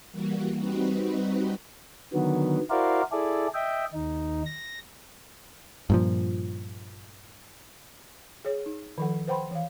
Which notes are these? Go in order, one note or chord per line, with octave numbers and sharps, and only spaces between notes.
E3 G3 A#3 F#4
G3 C4 D#4 F#4 B4
D3 D#3 F#3 B3
E4 F#4 A#4 C5 D5 F5
E4 G#4 A4 D5
D#5 E5 G5
D#2 D#4
A#6
G2 A#2 F3
G#4 C#5
D#4
D#3 F3 A4 F#5
B4 C5 F#5 G5 B5 C6
E3 F5